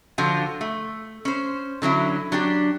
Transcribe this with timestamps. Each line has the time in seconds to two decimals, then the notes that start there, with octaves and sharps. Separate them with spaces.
0.18 D3 F3 F4 F#4
0.61 A3
1.25 C#4 C5
1.82 D3 F#3 C#4 E4
2.32 F#3 D4 G4